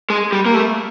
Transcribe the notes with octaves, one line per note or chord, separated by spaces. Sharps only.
G#3
G3
A#3
A3